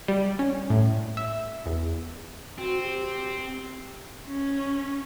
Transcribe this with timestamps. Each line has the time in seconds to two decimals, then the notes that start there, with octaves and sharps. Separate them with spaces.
0.08 G3
0.39 C#4
0.70 A2
1.17 E5
1.66 E2
2.58 C4 F#4
2.83 G4
4.28 C#4